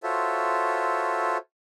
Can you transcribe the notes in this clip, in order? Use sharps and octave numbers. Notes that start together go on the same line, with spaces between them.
F4 F#4 A4 C5 C#5 E5